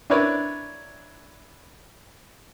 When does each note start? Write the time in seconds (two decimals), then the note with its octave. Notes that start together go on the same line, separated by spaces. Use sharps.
0.10 D4 E4 A#4 B4 C#5 D5